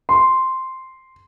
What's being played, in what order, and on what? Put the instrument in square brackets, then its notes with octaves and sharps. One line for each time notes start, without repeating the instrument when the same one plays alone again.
[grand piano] C6